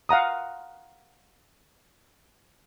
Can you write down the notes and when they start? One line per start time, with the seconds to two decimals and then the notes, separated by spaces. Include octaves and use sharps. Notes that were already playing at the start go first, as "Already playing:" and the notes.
0.09 F5 F#5 A#5 D#6